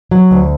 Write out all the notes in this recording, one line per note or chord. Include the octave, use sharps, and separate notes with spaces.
F#3
D2